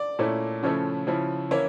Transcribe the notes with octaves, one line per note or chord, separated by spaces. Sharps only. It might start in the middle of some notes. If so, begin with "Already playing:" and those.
Already playing: D5
A#2 A3 C#4 E4
C#3 F3 A3 C#4 E4 C#5
C#3 F3 C#4 E4
E3 A#3 C#4 E4 C#5